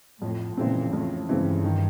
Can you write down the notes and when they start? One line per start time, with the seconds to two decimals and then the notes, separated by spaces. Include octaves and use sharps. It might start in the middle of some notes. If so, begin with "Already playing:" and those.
0.22 F2 A2
0.57 A#2 C#3 E3 G#3 C4
0.93 F2 A2
1.28 G2 C#3 E3 G#3 C4
1.64 D#3